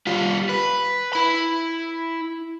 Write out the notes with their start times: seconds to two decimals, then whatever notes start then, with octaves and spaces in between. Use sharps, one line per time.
0.07 G3 F4
0.49 B4
1.13 E4 B5